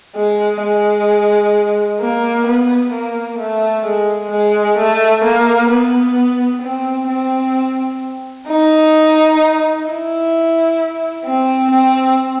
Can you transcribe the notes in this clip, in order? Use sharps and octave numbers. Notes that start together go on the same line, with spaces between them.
G#3
G#3
A#3
B3
A#3
A3
G#3
G#3
A3
A#3
B3
C4
C4
D#4
E4
C4
C4